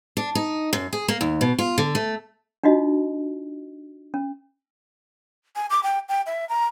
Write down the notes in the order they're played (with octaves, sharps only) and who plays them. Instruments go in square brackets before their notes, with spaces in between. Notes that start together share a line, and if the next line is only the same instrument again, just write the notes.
[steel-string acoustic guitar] D4
D#4
F#2
G#4
A#3
D#2
B2
F4
D3
A3
[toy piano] D4 D#4 F4 F#4 D#5
C#4
[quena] G#5
D6
G5
G5
E5
A#5